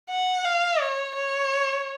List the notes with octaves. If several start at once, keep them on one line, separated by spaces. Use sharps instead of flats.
F#5
F5
C#5
C#5